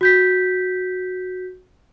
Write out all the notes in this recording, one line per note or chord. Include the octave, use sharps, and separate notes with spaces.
F#4 G6 B6